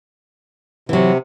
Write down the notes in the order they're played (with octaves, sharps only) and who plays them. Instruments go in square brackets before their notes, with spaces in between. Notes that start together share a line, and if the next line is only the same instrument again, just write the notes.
[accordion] C3 [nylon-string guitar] E3 F#3